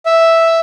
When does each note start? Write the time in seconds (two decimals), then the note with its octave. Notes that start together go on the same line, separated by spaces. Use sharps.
0.06 E5